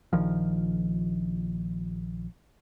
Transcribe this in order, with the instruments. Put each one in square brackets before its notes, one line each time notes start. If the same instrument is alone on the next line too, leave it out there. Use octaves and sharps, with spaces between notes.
[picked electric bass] A#1 D#3 F3